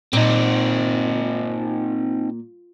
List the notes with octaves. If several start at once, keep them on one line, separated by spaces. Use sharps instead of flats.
A#2 C4 D#4